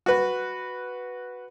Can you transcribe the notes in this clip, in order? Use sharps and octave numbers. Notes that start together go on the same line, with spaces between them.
F#4 B4